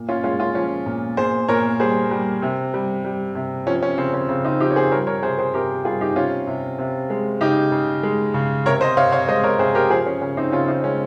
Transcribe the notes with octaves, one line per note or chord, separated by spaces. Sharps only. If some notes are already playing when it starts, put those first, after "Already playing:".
Already playing: A#2
C#4 F4
G#3 C#4 F4
C#4 F4
F3 C#4
A#2
A#2 G#4 C5
A#2 A#4 C#5
G3 G#4 C5
G3
C3
G3
G3
C3
F3 C#4
C#4
C#3 C4
C#4
C#3 C4
C4 D#4
F3 D#4 G4
C#5
G#4 C5
G3 A#4 C#5
A#4 C#5
C3 G#4 C5
G#4 C5
C3 G4 A#4
G3 F4 G#4
D#4 G4
C3 C#4 F4
C3
C3
G#3
C#3 D#4 G4
C#3
G#3
C#3
C3 A#4 C#5
C5 D#5
C3 C#5 F5
C#5 F5
G#3 C5 D#5
A#4 C#5
C3 G#4 C5
G4 A#4
F3 G#4 C5
C#4
C#3 C#4
C4 D#4
C#3 C#4 F4
C4 D#4
G#3 C#4